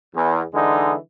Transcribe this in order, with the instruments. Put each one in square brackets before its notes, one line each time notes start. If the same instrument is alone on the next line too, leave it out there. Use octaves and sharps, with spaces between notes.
[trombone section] E2
D3 E3 G#3 D#4